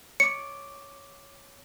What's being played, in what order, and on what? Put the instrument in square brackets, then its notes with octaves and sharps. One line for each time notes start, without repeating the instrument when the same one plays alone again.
[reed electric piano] C#5 D6 [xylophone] C#7